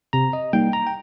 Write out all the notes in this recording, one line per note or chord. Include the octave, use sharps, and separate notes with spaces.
C3 A#5
D#5
G3 A#3 D#4 G5
A#5
G5